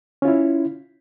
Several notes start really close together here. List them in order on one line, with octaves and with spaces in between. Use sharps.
C#4 F4 E4